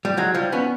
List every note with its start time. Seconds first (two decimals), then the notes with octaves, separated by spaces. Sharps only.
0.05 G3
0.17 F#3 G#3
0.34 F3 G3
0.52 B3 C#4